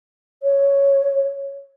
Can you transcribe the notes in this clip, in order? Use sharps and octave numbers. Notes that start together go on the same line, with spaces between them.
C#5